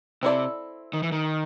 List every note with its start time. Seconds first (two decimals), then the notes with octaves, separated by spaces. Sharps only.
0.23 C3 C4 E4 A4 D5
0.93 D#3
1.03 E3
1.12 D#3